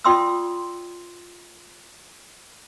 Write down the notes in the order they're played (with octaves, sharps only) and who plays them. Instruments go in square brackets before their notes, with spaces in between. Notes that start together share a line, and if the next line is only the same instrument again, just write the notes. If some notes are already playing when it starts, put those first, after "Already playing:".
[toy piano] F4 D5 G5 C6 D#6 E6